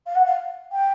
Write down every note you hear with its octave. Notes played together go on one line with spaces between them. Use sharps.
F5
F#5
F5
G5